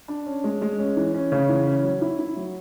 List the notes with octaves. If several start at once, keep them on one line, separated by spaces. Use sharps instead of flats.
D4
C#4
G#3
G#3
C#4
E3
C#4
C#3
E3
C#4
F#3
E4
E4
F#3